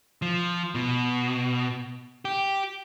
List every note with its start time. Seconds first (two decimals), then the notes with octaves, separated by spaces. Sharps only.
0.22 F3
0.75 B2
2.25 G4